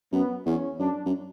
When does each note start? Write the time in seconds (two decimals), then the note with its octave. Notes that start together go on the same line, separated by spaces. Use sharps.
0.12 F#2 B3
0.46 E2 C#4
0.79 F#2 D4
1.06 F#2